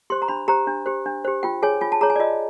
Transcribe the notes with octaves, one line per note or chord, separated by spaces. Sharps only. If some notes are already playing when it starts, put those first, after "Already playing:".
G4 C5 C6
A#5
D4 B5
G4 C5 A#5
D4
G4 C5
D4
G4 C5
F4 G5
G#4 C#5 G#5
F4 G#5
A5
G#4 C#5 A#5
G#5
D5
F4 D#5